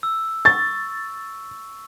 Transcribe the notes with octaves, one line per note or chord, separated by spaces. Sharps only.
E6
C#6 A6